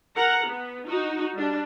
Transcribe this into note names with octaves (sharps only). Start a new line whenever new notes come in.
A#4 F#5 A#5
B3
D#4 F#4
G3 D4